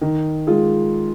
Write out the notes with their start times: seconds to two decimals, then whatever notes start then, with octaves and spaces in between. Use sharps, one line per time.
0.01 D#3
0.47 G#3 F4 G#4